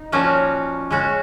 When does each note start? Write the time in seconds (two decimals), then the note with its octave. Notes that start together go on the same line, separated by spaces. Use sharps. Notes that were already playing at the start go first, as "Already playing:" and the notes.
Already playing: D#4
0.12 A#2 F3 A#3 C#4 F#4
0.91 G#3 C#4 F#4